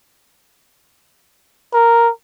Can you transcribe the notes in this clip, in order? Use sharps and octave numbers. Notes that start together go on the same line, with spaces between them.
A#4